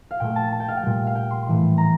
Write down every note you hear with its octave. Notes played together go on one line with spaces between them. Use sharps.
F5
A#2 A3 G5
A5
A5
G5
F5
G5
A#2 G3
F5
G5
C6
A2 E3 A3 C6
A#5